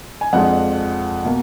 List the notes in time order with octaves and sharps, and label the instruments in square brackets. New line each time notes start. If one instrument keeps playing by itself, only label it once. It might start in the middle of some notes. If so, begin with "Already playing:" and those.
[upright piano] G#5
F2 F3 G#3 D4 F#5
B2 A#3